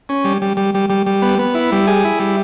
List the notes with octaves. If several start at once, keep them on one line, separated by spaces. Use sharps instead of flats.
C#4
G3
G3
G3
G3
G3
G3
B3
B3
E4
G3
G#4
E4
G3